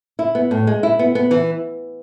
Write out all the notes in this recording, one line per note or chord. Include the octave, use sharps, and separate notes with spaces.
E4
B3
A2
G#3
E4
B3
B3
E3